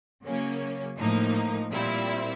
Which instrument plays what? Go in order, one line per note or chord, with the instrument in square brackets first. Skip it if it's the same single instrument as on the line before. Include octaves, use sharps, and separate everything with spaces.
[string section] C#3 F#3 A#3 C#4
A2 F3 A#3 D#4
A#2 G3 C4 E4